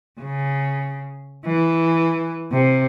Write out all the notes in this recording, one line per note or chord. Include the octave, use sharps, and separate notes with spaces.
C#3
E3
C3